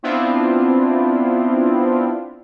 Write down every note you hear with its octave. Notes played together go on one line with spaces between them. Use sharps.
B3 C4 D4 E4 F4